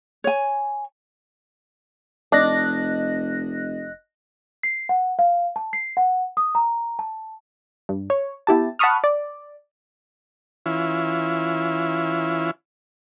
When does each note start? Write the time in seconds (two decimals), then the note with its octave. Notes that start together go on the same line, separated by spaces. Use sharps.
0.24 C#5 G#5
2.32 F1 D4 D#5 F#6 A#6
4.63 C7
4.89 F#5
5.19 F5
5.56 A5
5.73 C7
5.97 F#5
6.37 D#6
6.55 A#5
6.99 A5
7.89 G2
8.10 C#5
8.47 B3 E4 G4 A5
8.79 F#5 A5 B5 C#6 D#6 F6
9.04 D5
10.66 E3 C#4 E4 F4